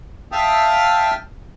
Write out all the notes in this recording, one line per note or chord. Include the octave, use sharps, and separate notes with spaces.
E5 F5 G5 A5 D#6 F6